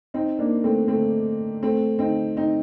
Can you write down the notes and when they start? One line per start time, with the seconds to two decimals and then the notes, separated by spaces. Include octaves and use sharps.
0.14 C4 D#4
0.39 A#3 D4
0.64 A3 C4
0.88 A3 C4
1.63 A3 C4
1.99 C4 D#4
2.37 C4 D#4